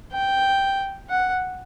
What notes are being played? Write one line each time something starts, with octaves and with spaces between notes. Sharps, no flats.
G5
F#5